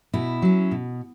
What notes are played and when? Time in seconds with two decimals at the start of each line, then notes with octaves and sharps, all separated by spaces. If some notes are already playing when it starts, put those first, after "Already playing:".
0.13 B2 E4
0.42 F#3 C#4
0.71 B2